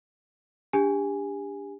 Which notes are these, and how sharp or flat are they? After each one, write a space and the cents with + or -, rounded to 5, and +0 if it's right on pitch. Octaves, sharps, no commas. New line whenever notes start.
D4 -15 G4 +30 G#5 +0